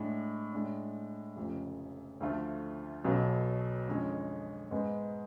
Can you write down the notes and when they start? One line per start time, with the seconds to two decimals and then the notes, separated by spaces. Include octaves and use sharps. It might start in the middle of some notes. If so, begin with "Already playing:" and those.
Already playing: A2 G#3 D4
0.53 A2 G#3 D4
1.36 F1 F2 C#3
2.21 D2 D3 F3 A3 F4
3.05 B1 B2 F#3
3.88 F2 D3 G#3 C#4
4.71 G#2 G#3 B3